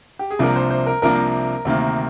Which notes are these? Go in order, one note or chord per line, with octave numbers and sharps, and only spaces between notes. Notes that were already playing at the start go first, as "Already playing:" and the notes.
G4
G#4
C2 C3 F3 A#3 D4 A#4
C5
C5
A#4
C2 C3 F3 A#3 D4 A#4
D2 C3 D#3 A#3